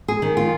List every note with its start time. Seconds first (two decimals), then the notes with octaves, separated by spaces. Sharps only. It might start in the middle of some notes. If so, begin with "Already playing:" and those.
0.08 G#4
0.22 D#3
0.37 F4